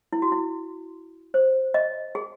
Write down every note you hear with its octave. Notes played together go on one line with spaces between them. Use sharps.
E4
F#4
E4
C5
D#5
G#4